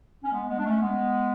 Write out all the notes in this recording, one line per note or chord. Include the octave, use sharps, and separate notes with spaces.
C#4
G#3 B3
G#3 B3
D4
A3 C#4
G#3 B3